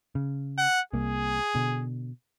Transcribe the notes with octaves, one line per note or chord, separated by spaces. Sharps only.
C#3
F#5
C2 A#3 G#4
B2 D3